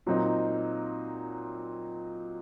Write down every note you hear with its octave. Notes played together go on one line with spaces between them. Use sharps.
A#2 F#3 C4 D#4